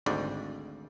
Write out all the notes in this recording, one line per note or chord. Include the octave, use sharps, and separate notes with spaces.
G#1 D2 G#2 D5